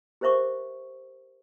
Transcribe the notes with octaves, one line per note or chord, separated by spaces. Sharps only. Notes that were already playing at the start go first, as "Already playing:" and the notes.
G4 A#4 C5 E5 C#6 D6